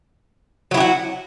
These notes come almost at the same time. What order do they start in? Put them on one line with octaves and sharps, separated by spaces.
F#3 E4 G4 F#4